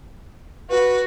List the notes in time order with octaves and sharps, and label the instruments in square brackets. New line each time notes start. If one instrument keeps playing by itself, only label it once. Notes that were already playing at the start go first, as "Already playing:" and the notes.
[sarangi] F#4 [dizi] B4